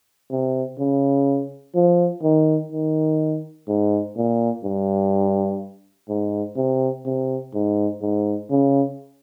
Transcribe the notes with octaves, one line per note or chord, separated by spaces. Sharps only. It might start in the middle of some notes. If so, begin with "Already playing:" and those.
C3
C#3
F3
D#3
D#3
G#2
A#2
G2
G#2
C3
C3
G#2
G#2
C#3